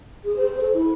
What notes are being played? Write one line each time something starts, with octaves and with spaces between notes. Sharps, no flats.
G#4
C5
A4
E4